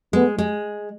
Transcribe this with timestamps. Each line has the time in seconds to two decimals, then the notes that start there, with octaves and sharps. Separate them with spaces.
0.13 G#3 A3 B3
0.38 G#3